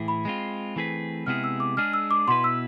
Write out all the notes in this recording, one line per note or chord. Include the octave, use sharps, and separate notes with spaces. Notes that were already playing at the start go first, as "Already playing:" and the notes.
Already playing: A2 E3 E4 G#4
B5
G#3 C4 F4
E3 A3 C4 G#4 B4
C3 G#3 B3 E4 G#4 F6
E6
D6
G#3 D4 G#4 F6
E6
D6
B2 B3 E4 B4 C6
E6